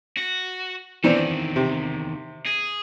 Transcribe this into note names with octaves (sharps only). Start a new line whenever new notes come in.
F#4
E2 D#3 E3 C4 D4
C3
G#4